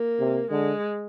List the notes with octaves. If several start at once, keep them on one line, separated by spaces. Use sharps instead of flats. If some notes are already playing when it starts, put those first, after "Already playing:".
Already playing: A#3
C3
D3 G#3